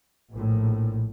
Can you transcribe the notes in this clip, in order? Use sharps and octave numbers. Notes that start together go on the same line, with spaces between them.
A#1 A2